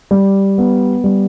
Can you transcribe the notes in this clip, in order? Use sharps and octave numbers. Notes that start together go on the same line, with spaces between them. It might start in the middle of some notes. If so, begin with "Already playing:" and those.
G3
B3
G3